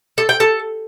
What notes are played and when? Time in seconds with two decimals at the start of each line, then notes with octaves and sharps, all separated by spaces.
0.18 A4
0.29 G5
0.40 A4